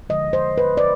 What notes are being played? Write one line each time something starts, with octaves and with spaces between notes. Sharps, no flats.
D3 F3 G#3 D#5
C5
B4
D5